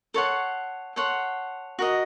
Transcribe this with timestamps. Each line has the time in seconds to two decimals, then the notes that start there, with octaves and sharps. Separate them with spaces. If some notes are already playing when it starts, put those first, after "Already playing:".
0.14 A4 C#5 F#5 C6
0.96 A4 C#5 F#5 C6
1.79 F#4 A#4 D#5